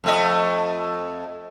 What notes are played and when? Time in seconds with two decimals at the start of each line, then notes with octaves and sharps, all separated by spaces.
0.04 F2 A3 D#5